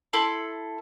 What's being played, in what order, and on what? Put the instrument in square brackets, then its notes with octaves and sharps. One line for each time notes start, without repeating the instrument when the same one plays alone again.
[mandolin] E4 A4 B5 C6